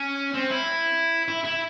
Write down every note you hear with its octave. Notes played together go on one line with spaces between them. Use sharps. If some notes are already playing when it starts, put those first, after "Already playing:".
Already playing: C#4
C4
E4
E4
E4